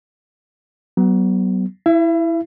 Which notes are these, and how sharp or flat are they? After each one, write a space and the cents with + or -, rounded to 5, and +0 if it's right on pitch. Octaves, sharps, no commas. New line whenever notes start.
F#3 +35 B3 +0
E4 +0 E5 +40